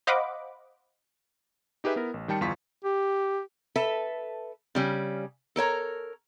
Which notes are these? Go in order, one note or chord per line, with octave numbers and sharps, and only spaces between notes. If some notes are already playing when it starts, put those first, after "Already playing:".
C5 D#5 F5 F#5 B5 D6
D#4 G4 G#4 B4 E5
B3 E4 A#4
A1
D#3 G3 G5 A5 C#7
G1 E2 F4 C6 C#6 B6
G4
A4 B4 E5
C#3 G3 C#4
A4 A#4 C#5 A#5